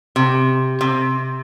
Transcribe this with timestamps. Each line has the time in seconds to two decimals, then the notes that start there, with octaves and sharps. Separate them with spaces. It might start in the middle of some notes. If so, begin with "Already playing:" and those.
0.16 C3
0.81 C3